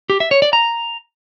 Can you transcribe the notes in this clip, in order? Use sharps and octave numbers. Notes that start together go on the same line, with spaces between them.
G4
E5
C#5
D5
A#5